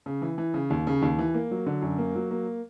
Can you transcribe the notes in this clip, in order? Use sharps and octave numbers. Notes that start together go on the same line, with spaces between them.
C#3
E3
E3
C#3
D#2
C#3
D#2
E3
A#3
F#3
D3
F#2
A#3
F#3
A#3